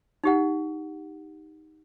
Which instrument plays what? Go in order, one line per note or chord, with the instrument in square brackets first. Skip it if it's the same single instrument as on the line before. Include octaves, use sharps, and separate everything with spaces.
[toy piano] D#4 G4 F#5